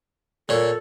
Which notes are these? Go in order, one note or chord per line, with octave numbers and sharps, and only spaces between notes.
A#2 A4 C#5